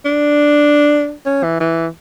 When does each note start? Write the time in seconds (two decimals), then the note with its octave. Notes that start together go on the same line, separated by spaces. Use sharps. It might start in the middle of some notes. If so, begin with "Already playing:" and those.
0.05 D4
1.25 C#4
1.43 E3
1.60 E3